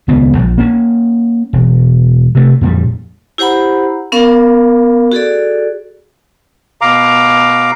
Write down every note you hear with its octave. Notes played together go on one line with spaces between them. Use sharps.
D#1 C#2 B3
A#1
A#3 C#4
E1
C3 A3
F2 A#2 G3
E4 G4 C5 F#5 A#5 B5
B3 C#4 A#4 F5
F#4 G#4 A4 D5
B2 F5 A#5 D6